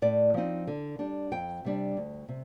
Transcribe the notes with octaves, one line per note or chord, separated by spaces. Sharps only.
A2 D5
F3 C4 D#4
D3
G3 D4
F2 G5
C3 G3 D4
D2
C3